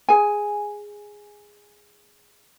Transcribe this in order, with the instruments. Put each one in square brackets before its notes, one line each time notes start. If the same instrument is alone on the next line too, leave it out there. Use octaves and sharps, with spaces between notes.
[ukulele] G#4 G#5